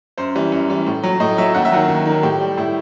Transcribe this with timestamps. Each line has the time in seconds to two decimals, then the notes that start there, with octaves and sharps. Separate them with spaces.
0.18 F#2 C5
0.35 E3 G3
0.52 F#2
0.70 E3 G3
0.87 A2
1.03 F#3
1.20 A2 D#5
1.38 F#3 E5
1.55 D#2 F#5
1.65 E5
1.72 D#3 F#3 F#5
1.88 D#2
2.05 D#3 F#3
2.23 A2 G4
2.41 G3
2.58 A2 E4